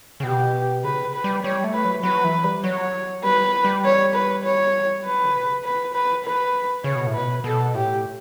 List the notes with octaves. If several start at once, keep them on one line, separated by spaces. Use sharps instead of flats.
C#3
B2 G4
C#3 B4
B4
G3
G3 C#5
A3
B4
F#3
F#3 B4
E3
G3
F#3 C#5
G3 B4
G3
C#5
B4
C#5
F#3 B4
D3
B2
C#3
B4
B4
B4
C#3 C#5
B2
A2
B2 B4
B2 A4
A2 G4